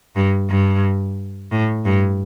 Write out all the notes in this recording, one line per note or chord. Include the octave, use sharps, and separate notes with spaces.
G2
G2
A2
G2